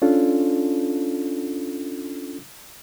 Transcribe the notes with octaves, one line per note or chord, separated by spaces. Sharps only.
C#4 D4 F4 A4